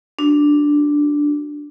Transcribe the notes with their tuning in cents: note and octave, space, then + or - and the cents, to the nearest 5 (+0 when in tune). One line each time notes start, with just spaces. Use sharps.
D4 +0 F#4 +0